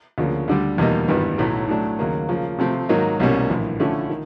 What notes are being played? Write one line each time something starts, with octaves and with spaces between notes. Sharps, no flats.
D2 C#3 F3 A#3
D2 D3 G3
E2 B2 G3 A#3 D#4
G#1 G2 E3 G3 B3
B1 A2 F#3 A3
A2 F#3 A3 D4
D#2 C#3 F#3 A#3
C#3 F3 A#3
C3 F3 A3 C4
G#2 D#3 F#3 A#3 D#4
C2 B2 G3 A#3 C#4
A#1 A2 E3
D3 F3 A3 C#4 E4
D#3